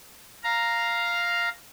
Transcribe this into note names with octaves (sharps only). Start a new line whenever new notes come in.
F5 A#5